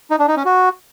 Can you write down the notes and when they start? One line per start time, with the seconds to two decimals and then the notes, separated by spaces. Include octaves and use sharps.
0.11 D#4
0.19 D4
0.28 D#4
0.37 C#4
0.45 F#4